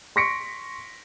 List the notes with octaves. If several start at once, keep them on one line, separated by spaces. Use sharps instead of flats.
C6 C#6 A#6 B6 C#7 D7